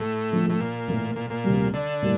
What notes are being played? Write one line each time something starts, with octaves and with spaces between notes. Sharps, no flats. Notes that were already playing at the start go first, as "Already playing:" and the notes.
Already playing: A2
D3 F3 A3
A2
A#2
A2 E3 A#3
A#2
A#2
D2 C3 G3
D3
A2 G3 A#3